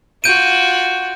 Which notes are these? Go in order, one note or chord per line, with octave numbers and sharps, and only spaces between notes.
F4 F#4 G6 D7 D#7